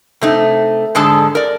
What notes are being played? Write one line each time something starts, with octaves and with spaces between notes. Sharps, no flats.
C3 A3 D#4
G#2 D3 G#3 G#4 A4 A5
A#4 D5